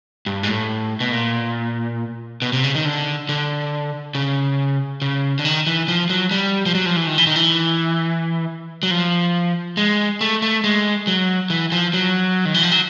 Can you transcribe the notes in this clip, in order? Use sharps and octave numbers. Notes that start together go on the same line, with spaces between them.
G2
G#2
A2
B2
A#2
B2
C3
C#3
D#3
D3
D3
C#3
C#3
D3
D#3
E3
F3
F#3
G3
F3
F#3
F3
E3
D#3
E3
D#3
E3
F#3
F3
G#3
A3
A3
G#3
F#3
E3
F3
F#3
D#3
E3
F3
F#3